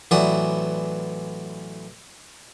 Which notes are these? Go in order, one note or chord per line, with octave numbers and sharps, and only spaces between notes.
A1 E3 F#3 D5 F#5 D#6